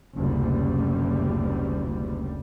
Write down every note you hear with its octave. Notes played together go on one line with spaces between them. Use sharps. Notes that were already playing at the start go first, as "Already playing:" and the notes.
F#1 D2 C3 G3